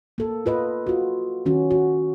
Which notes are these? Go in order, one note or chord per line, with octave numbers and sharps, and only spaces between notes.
A#3 A4
F4 B4 D#5
F4 F#4
D#3 C#4 F#4
F#4